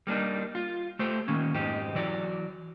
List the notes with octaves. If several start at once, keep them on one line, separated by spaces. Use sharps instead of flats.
G3 A#3 D4 D#4
F4
A3 G4 C5
D#3 A#3 C#4
F2 G#2 D#4 G4
E3 F#3 D5